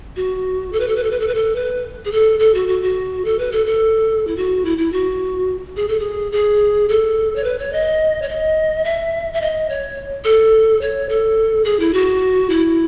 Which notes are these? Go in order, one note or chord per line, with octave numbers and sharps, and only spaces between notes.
F#4
A4
B4
A4
B4
A4
B4
A4
B4
A4
B4
G#4
A4
A4
F#4
F#4
F#4
A4
B4
A4
A4
E4
F#4
E4
E4
F#4
G#4
A4
G#4
G#4
A4
C#5
B4
C#5
D#5
C#5
D#5
E5
E5
D#5
C#5
A4
C#5
A4
G#4
E4
F#4
E4